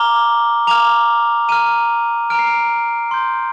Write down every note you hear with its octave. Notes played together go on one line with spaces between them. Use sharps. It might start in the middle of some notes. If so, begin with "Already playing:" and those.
Already playing: A#5 D6 F6 G7
A#5 D6 F6 F7
A#5 F6 D#7
A#5 F6 D7
C7
D7
C6 G6